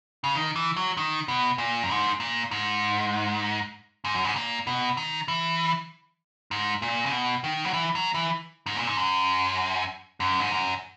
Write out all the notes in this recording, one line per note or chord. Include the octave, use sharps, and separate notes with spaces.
C#3
D#3
E3
F#3
D#3
B2
A#2
F#2
G#2
A#2
G#2
G#2
F#2
G#2
A#2
B2
D#3
E3
G#2
A#2
C#3
B2
D#3
F#3
E3
F#3
E3
G#2
A#2
G#2
F#2
F#2
G#2
F#2